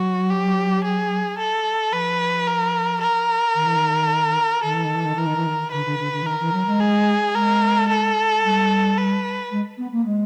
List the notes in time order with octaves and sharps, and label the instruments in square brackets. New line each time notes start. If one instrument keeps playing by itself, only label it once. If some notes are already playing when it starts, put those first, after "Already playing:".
Already playing: [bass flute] F#3 [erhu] F#4
[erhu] G4
G#4
A4
[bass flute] F3 [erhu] B4
[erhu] A#4
A#4
[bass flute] D#3
E3
D#3
[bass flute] D#3 [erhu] A4
[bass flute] E3
D#3
E3
D#3
[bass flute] E3 [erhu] A#4
[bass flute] D#3
E3
D#3
[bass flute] D3 [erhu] B4
[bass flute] D3
D3
D3
E3
[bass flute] D#3 [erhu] A#4
[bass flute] E3
F#3
G#3
[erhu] G#4
[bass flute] G#3 [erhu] A#4
[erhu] A4
[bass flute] G3
[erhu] B4
[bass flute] G#3
B3
A#3
G#3